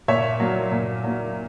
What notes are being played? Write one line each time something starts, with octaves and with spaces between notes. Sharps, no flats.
A#2 C#5 E5
F#3 A#3
A#2
F#3 A#3